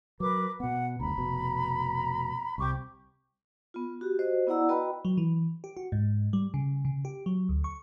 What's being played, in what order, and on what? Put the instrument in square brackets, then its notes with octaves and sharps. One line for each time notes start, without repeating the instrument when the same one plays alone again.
[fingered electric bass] F#3 [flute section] A#4 B4 D6
[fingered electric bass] B2 B3 [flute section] F#5
[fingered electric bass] F#1 D2 [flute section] A#5 B5
[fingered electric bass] F1 B2
[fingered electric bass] C2 C3 [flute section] G4 C#6 D6
[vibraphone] B3 F4
F#4 G4
F#4 C5 D#5
B3 E4 D5 F#5 A#5 E6
F#4 B4 D#5 G5 A#5 B5
[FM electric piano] F#3
E3
G4
F#4
G#2
G3
C#3
C#3
G4
F#3
D2
C#6